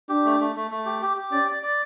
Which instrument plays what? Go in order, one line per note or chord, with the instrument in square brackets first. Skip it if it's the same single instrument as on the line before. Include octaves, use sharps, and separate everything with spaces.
[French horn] D4 [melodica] G4
[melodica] A3
A3
A3
A3
G4
G4
G4
[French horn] C#4 [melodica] D5
[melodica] D5
D5